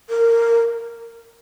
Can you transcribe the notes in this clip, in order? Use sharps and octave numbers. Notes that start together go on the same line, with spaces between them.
A#4